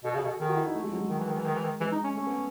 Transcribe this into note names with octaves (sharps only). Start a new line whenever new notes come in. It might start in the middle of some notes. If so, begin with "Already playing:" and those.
B2 A4
C#3 G#4
B2
D#3 G#4
F#4
E4
D#4
A3
G#3
F#3
G#3
D#3
E3
D#3
E3
D#3
E3
D#3
E3 G#3
D#4
C#4
A3 C#4
B3